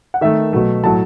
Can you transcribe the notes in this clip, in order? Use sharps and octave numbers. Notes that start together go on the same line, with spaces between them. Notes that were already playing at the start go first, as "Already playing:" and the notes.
F#5
D#3 A3 E5
B2 F#3 A3
A2 F#3 A3 A5